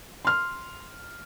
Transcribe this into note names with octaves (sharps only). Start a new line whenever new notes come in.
C6 F6